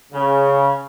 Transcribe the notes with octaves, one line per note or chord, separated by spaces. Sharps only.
C#3